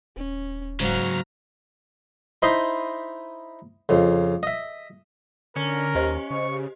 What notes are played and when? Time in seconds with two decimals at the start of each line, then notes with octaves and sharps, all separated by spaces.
0.17 D#1 C#4
0.80 G#2 C#3 F#3 F#4 F5 A#5 F6
2.42 D#4 E4 C5 D#5 B5 C6
3.89 F2 C#3
4.43 D#5 E5
5.56 D3 C#4 A#4
5.95 D#2 G4 C5 D#5
6.30 C#3 C#6